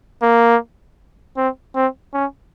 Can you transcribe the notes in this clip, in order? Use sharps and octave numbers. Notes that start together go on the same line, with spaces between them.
A#3
C4
C4
C#4